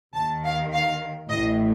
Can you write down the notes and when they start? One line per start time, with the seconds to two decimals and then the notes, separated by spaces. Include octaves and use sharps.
0.15 D#2 D#3 A5
0.44 F5
0.72 F5
1.30 A1 A2 D#5